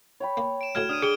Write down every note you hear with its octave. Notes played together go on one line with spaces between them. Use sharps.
C#5 G5 B5
A#3
D7 E7
A2 F#3 D#5 F6 G#6 E7
D3 D#6 F6 D#7
G4 G#4 D7 G7